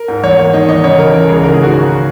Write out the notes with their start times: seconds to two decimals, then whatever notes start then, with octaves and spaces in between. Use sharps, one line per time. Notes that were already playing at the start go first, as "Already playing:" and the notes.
Already playing: A#4
0.08 G#2
0.24 E2 C#5
0.38 A#3
0.53 D#3 D#5
0.68 E2 D#5
0.84 C#3 C#5
0.99 C#3 A#4
1.14 E3 A#4
1.29 C#2 G#4
1.44 G#2 A#4
1.54 G#4
1.59 D#3 F#4
1.74 G#2 F#4